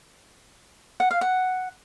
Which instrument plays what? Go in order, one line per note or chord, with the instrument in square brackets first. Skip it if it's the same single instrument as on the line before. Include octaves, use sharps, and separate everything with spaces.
[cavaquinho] F#5
F5
F#5